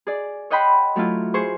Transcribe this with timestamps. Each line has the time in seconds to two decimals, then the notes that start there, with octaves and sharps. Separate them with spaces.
0.07 G#4 D5
0.50 C#5 D#5 F#5 G5 B5 C6
0.96 F#3 A3 E4 F4
1.34 G#4 C5 C#6